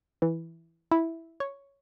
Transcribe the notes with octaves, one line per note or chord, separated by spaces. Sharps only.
E3
E4
C#5